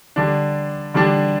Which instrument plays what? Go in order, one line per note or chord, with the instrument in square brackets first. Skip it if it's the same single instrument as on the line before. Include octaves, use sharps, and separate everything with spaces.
[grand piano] D3 G3 D4
D3 G3 D4